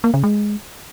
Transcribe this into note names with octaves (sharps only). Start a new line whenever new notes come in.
A#3
C#3
G#3